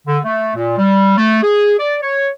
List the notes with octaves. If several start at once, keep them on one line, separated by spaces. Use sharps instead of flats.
D3
A3
A#2
G3
A3
G#4
D5
C#5